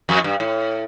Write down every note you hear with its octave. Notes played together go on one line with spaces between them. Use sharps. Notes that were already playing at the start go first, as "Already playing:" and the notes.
F2
G2
A2